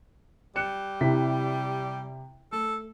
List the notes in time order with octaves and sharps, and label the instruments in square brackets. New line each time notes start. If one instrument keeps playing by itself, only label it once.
[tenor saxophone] G3 [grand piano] F#6 C#7 E7
[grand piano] C3 E4 B6
[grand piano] A3 [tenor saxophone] A4